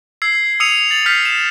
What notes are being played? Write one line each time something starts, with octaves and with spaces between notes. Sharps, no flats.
E6 G#6 C7
D#6 E6 C#7 D#7 F7 F#7
A6 F#7
F6 G6 B6 C7 F7
E7